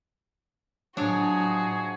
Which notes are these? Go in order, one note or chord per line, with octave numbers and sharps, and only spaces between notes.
A2 F3 F#3 D4 D#4 F#4 G#4 C#5